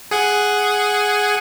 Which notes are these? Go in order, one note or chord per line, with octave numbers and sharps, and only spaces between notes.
G#4 F#5 G#5